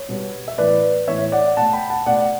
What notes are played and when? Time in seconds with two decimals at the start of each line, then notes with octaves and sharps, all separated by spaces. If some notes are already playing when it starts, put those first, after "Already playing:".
Already playing: C#5
0.09 B2 G3 B3
0.48 E5
0.58 A2 E3 B3 B4 D5
1.08 A2 E3 B3 C#5 E5
1.32 D5 F#5
1.57 B2 A3 F#5 A5
1.73 G5 B5
1.90 F#5 A5
2.06 B2 A3 D5 F#5